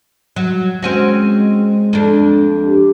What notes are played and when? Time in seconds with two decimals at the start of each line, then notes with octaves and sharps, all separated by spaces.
0.36 F#3
0.82 G#3 C4 C#4 F#4
1.93 F2 D4
2.65 G4